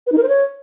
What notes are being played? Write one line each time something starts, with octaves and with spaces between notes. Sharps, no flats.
B4
D#4
A#4
C5
C#5